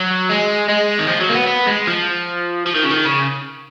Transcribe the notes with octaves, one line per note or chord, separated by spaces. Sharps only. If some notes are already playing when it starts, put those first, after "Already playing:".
Already playing: F#3
G#3
G#3
D#3
F3
F#3
A#3
B3
B3
G#3
F3
F3
D#3
C#3
D#3
C#3